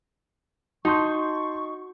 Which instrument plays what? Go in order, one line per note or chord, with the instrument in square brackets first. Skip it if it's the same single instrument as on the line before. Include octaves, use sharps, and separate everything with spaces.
[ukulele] D#4 [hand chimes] F#4 [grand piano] A5 C6 G6 [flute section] C#6